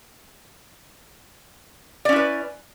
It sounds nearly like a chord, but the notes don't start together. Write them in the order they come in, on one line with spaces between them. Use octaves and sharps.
D5 C#4 E4 B4